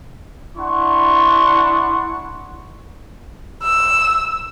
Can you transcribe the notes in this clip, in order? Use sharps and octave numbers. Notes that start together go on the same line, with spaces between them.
D4 E4 F#5 C6 C#6
E6